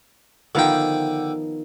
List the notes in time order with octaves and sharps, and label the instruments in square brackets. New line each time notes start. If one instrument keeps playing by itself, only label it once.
[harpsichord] D3 G5 [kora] D#3 F3 B3